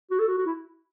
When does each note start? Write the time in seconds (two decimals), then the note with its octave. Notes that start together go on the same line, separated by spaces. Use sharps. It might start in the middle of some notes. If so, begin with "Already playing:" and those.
0.11 F#4
0.19 A4
0.28 F#4
0.38 F#4
0.46 E4